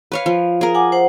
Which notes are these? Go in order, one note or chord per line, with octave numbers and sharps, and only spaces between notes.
B4 C#5 F5
F3
G#4 A#4
F#5 G#5 D6
C5 F#5